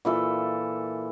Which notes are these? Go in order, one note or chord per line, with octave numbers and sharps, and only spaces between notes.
A#2 E3 A4